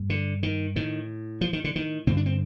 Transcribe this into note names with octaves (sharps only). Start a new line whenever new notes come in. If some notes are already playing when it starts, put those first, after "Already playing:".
Already playing: G2
D3
D#3
A2 D#3
F3
D#3
D3
D#3
G2 D3 C4
D4
C4